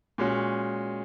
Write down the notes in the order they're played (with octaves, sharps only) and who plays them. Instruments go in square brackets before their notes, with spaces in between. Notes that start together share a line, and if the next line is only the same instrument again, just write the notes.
[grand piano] A#2 G#3 C#4 F#4